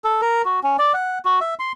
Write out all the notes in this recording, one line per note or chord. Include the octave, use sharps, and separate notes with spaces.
A4
A#4
F#4
C#4
D5
F#5
F#4
E5
C6